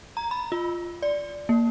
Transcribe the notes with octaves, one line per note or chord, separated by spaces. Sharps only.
A#5
B5
F4
D5
A#3